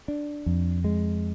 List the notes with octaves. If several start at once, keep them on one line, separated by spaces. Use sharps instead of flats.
D4
F2
G#3